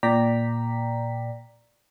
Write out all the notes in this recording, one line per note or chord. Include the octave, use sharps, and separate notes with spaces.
A#2 D5 G5 A#5 B6